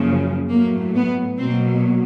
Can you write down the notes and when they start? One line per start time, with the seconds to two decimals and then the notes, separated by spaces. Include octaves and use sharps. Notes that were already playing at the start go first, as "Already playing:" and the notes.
Already playing: F#2 C#3 F3 A#3
0.50 A2 F#3 A3 A#3
0.95 B3
1.38 B2 F#3 A#3 C4